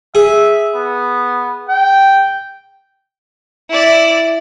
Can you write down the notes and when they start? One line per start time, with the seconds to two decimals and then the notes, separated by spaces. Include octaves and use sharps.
0.15 G#4 E5
0.75 B3
1.69 G5
3.70 E4 D5